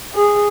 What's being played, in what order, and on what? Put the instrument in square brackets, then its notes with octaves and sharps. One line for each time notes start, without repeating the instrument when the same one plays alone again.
[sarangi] G#4